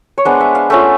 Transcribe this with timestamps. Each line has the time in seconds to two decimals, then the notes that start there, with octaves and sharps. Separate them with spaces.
0.18 C#5
0.25 G#3 B3 D4 C5
0.40 E5
0.55 F5
0.70 A3 C#4 F4 E5